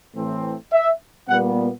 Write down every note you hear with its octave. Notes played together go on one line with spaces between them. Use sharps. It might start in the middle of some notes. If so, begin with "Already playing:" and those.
A2 E3 A3 C4
E5
A#2 G3 B3 F#5